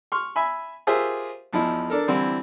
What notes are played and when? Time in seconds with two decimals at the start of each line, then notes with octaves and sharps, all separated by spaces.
0.12 C6 C#6 F6
0.36 E5 G#5 B5
0.87 F4 G4 G#4 A#4 C5 E5
1.53 E2 F3 D#4 E4
1.90 D4 A4 A#4
2.08 D3 E3 G3 C4 E4